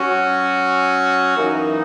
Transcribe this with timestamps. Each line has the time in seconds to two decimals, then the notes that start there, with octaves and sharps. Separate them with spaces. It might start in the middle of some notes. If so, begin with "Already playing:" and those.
Already playing: F#3 C#4 F#4
1.37 F#2 E3 A#3 D#4